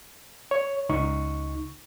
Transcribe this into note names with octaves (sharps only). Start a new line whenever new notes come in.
C#5
C#2 D#4 C#6